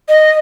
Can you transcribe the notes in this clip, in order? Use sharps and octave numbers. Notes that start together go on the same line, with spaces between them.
D#5